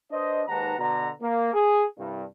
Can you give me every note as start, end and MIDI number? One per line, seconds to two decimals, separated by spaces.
0.11 0.43 62
0.11 0.43 71
0.11 0.43 72
0.11 0.43 75
0.49 0.78 39
0.49 0.78 44
0.49 0.78 71
0.49 0.78 78
0.49 0.78 81
0.49 0.78 82
0.78 1.09 47
0.78 1.09 50
0.78 1.09 82
1.21 1.53 58
1.54 1.85 68
1.98 2.23 36
1.98 2.23 43